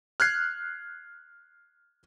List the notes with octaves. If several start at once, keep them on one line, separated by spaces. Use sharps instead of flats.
F6 F#6 G#6 C7